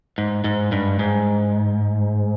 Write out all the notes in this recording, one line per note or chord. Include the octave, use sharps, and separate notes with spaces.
G#2
G#2
G2
G#2